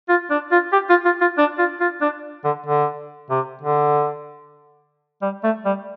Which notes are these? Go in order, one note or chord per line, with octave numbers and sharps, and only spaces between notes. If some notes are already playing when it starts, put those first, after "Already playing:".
F4
D4
F4
G4
F4
F4
F4
D4
F4
F4
D4
D3
D3
C3
D3
G3
A3
G3